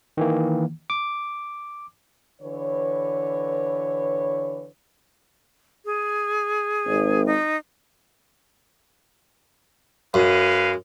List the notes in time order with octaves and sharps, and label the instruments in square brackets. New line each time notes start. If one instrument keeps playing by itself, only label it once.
[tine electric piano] D#3 E3 A#3
D6
[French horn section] D3 E3 B4 C#5
[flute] G#4
[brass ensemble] G#1
[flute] D#4
[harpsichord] F#2 [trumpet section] G#3 B4 F5